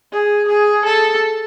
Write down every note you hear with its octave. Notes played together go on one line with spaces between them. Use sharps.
G#4
G#4
A4